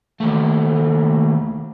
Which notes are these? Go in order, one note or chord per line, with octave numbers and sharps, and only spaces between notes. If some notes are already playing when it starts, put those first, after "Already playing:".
D#2 A3